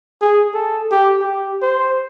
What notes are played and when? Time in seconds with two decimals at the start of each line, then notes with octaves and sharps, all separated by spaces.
0.21 G#4
0.54 A4
0.91 G4
1.22 G4
1.62 C5